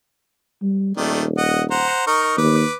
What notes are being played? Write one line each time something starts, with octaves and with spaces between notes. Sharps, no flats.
G3
D#1 D#3 A3 D5
D#5 F#5
C5 F#5 A#5
D#4 A#4 C#6
D#2 B4 D6